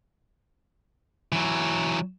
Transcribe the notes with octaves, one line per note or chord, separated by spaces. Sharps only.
E3 F#3